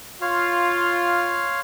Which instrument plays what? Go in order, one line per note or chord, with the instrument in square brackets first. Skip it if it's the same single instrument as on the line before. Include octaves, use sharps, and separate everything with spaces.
[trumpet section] F4 [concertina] C#5 F5 C6